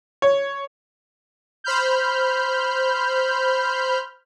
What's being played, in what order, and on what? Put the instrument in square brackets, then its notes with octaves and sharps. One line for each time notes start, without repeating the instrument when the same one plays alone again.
[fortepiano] C#5
[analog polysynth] C5 B5 F6 G6